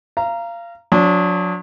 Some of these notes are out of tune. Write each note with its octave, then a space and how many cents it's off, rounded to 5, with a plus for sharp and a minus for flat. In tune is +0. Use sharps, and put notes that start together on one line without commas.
F5 -25 A#5 +0
F#3 -40 D4 -25